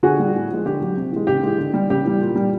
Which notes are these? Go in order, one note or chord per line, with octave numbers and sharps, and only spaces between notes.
D3 F#4 G#4
G3
A2
F3 G#3
D3 G4
F#3
C3
E3 G#3
C#3 G4
E3 G#3
D3
G3
C#3 G4
E3 G3
A#2
G3